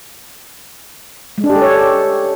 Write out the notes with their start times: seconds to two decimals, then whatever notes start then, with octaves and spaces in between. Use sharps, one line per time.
1.38 G#3
1.44 D4
1.50 G4
1.56 A4
1.62 C#5